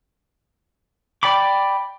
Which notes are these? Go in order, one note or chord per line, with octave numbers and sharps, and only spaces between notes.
D5 G5 B5 D6